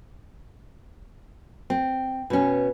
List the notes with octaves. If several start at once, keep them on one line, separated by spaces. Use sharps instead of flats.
C4
B2 C#4